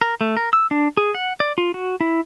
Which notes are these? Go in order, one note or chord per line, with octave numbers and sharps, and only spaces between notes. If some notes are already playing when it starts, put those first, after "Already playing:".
A#4
A3
A#4
E6
D4
G#4
F#5
D5
F4
F#4
E4